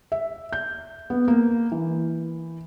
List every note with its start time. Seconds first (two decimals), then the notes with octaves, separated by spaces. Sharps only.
0.12 E5
0.53 G6
1.10 B3
1.28 A#3
1.72 E3